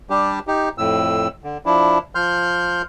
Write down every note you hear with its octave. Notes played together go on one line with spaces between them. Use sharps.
G3 D4 G4
D#4 G4
F2 A2 E6
D3
F3 D4 E4
F3 C6 F6 G6